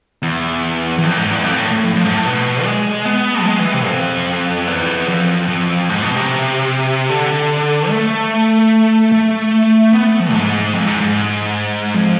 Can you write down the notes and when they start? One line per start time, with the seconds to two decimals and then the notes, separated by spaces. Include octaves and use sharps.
0.22 E2
0.98 E2
1.04 F2
1.17 G#2
1.30 E2
1.44 F2
1.58 A2
1.71 A2
1.84 F2
1.95 F2
2.05 G#2
2.14 A2
2.26 B2
2.65 G#3
3.05 B3
3.41 F3
3.46 G#3
3.60 E3
3.73 C3
3.87 F2
4.67 E2
5.08 F2
5.48 F2
5.89 G#2
6.02 B2
6.16 C3
7.09 D3
7.90 A3
9.12 A3
9.93 B3
10.06 A3
10.20 F3
10.33 G#2
10.73 F2
10.87 G#2
11.01 G#2
11.94 F2